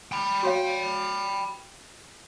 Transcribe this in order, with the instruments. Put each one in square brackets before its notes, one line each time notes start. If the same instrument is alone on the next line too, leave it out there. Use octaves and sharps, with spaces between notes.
[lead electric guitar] G5 B5
[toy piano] F#4 C#5 F5